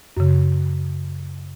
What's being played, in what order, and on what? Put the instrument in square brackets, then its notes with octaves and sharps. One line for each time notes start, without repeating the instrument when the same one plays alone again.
[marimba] F#2 C#3